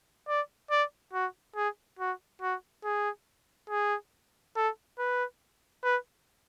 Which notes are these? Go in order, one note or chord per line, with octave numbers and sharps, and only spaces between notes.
D5
D5
F#4
G#4
F#4
F#4
G#4
G#4
A4
B4
B4